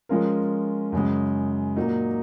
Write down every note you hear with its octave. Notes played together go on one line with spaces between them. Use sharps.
F3 G#3 C#4 F4 A#4
F#2 C#3 G#3
A#2 F#3 A#3 D#4